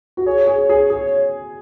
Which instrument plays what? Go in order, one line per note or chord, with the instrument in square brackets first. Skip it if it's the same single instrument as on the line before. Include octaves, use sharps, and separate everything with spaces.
[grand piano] F#4
[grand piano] G#4 [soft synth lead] C#5
[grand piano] G#4
G#4
G#4